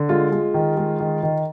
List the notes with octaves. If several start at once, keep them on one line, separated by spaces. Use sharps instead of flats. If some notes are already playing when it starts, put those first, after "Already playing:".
Already playing: D3
G#3 F4
G#3
D#3
G#3
D#3
D#3